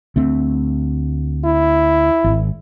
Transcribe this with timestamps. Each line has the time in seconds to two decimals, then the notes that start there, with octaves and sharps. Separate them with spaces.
0.16 D2 A3 C4
1.44 E4
2.24 G#1